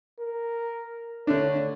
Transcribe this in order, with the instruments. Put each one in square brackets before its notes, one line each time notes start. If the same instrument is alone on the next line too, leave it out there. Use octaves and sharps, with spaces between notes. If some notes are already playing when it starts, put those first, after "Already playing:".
[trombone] A#4
[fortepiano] D3 A3 D4 [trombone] C#5